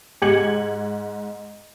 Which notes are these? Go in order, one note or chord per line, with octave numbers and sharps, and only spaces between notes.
G#2 G#6 C#7 F#7